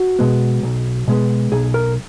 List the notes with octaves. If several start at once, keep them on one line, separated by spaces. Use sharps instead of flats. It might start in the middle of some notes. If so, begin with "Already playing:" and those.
Already playing: F#4
B2 G#3 B3
B1
B2 G#3 B3
B1 G#4
A#4